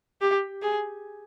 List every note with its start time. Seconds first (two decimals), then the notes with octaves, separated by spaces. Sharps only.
0.21 G4
0.62 G#4